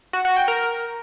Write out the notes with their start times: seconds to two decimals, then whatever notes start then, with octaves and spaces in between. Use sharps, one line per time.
0.13 F#4
0.25 F#4
0.36 G5
0.48 A#4